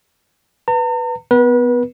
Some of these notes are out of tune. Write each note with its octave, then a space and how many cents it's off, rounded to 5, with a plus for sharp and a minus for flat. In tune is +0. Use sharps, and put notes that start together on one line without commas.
B4 +0 A#5 -45
B3 +15 B4 -30